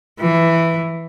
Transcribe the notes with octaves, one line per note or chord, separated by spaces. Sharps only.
E3